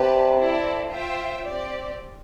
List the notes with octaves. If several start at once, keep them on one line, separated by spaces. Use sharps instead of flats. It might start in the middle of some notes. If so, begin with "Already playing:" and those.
Already playing: C3 G4 B4 D5 A5
C4 E4 A4 D5
F4 C5 E5 G5
C4 G4 D5